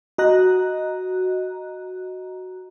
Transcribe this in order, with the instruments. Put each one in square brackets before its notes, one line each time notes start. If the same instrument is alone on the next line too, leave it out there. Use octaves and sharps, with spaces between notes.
[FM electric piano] F#4 D#5 A#5 F#6